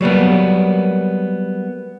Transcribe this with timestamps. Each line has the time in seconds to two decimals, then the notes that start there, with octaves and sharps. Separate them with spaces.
0.01 F#3 G3 A#3 B3